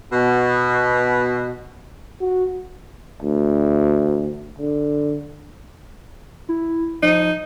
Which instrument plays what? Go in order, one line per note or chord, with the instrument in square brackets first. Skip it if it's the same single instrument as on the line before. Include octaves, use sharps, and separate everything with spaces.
[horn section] B2
[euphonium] F#4
D2
D3
[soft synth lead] E4
[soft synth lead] F3 [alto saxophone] D#4